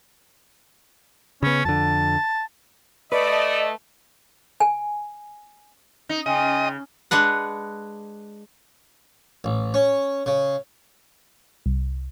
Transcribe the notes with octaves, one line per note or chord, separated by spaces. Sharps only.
C#3 B3 C#4
F2 D3 A5
A3 B4 D5 D#5
G#5
D#4
C#3 D#5 G5 G#5 C6
G#3 D4 B4 F#5
A1
C#4
C#3
C2